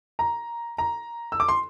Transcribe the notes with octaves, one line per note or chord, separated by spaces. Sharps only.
A#5
A#5
E6
D6
C6